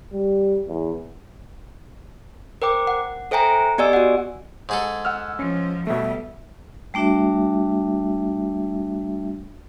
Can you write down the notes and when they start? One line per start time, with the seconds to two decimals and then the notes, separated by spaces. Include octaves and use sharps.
0.13 G3
0.68 E2
2.62 A#4 C5 G5 D6
2.87 F#5
3.31 A4 C5 E5 G5 G#5 A#5
3.78 B3 G4 D5 D#5 G#5 E6
3.93 F#4 F#5
4.69 G#2 G#4 A4
5.05 F#5 E6 F6
5.39 F3 C#4
5.87 B2 G3 A3 E5
6.94 G3 A3 D4 F#4 E5